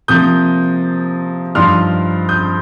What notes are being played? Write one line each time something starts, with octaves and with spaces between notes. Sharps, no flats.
C3 F3 A#3 D#6 G6
G2 F3 D#4 C6 F6
D#6 G6